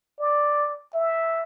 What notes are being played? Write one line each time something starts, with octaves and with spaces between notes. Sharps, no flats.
D5
E5